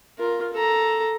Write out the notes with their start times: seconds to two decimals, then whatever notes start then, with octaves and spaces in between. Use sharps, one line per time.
0.18 F4 A#4
0.53 A4 A#5